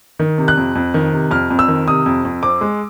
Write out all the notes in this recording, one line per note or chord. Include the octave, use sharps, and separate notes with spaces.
D#3
C3
F#6
F2
F2
D#3
C3
F2 F6
F2
E6
D#3
C3 D#6
F2
F2
C4 D6
G#3